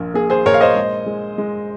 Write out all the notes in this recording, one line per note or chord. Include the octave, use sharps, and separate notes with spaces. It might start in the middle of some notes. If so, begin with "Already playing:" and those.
Already playing: A#1 A#2 A#4
A#3 G#4
G#4 C5
A#2 A#4 C#5
F5
C5 D#5
G#3
G#3
G#3